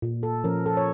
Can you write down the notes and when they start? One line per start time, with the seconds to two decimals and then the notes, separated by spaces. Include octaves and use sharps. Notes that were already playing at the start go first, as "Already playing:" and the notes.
0.02 A#2
0.23 A4
0.44 F3 C#4 A#4
0.66 A4
0.77 C#5